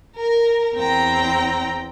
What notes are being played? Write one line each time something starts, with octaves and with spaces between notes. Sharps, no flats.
A#4
E2 C4 G5 A#5